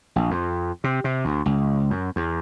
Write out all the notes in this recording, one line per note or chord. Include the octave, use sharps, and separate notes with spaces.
A#1
F2
C3
C3
D2
C#2
F#2
E2